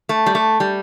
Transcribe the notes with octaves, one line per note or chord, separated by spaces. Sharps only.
A3
G3
A3
G3